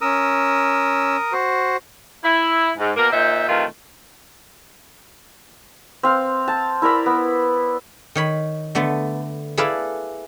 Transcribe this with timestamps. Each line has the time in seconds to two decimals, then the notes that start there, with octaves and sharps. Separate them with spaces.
0.01 C#4 A#4 D#6 E6
1.33 F#4 C5
2.24 E4
2.79 G#2
2.96 B2 A#3 A#4
3.12 A#2 D#4 C5 E5
3.48 C3 D#3 E3 A3 F4
6.03 C4 F5
6.48 A5
6.82 E4 A#4 D5 B5
7.06 B3
8.15 D#3 C#5 B5
8.75 D3 A3 B3
9.58 E4 G#4 A4 B4 D5 F5